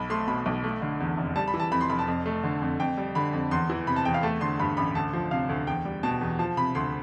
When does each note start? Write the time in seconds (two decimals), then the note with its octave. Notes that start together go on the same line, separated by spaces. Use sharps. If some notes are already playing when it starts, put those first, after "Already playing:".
Already playing: B1 B5
0.10 A3 C6
0.28 B2 B5
0.46 B1
0.64 A3
0.82 D3
1.00 E2
1.17 F1
1.36 G3 A5
1.48 B5
1.54 E3
1.60 A5
1.71 F2 B5
1.81 C6
1.90 F1 B5
1.99 A5
2.07 F2
2.26 A3
2.44 D3
2.62 F2
2.79 F2 G5
2.97 G3
3.15 D3 B5
3.33 F2
3.51 E2 C6
3.70 E3
3.87 C3 B5
3.96 A5
4.05 E2 G5
4.14 F5
4.23 A3 A5
4.41 D3 C6
4.59 G2 B5
4.77 A1 B5
4.95 D2 A5
5.13 F3
5.31 C3 F5
5.49 D2
5.67 E2 G5
5.85 G3
6.03 B2 A5
6.21 E2
6.39 F3 A5
6.57 C3 B5
6.75 D2 C6